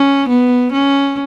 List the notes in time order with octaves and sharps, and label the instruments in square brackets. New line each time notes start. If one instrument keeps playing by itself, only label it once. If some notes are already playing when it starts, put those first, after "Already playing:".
Already playing: [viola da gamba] C#4
B3
C#4